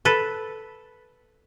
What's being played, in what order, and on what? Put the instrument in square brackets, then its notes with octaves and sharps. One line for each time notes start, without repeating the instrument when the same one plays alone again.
[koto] A4 B4